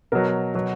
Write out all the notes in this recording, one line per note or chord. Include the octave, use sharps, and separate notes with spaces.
B2 F#3 A#4
B2 F#3